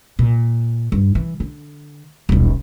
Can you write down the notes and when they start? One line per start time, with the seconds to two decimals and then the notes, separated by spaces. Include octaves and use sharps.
0.19 A#2
0.92 G2
1.15 E3
1.40 D3
2.29 D#1 B1